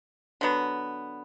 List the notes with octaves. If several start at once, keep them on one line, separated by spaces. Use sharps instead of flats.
D3 F#3 B3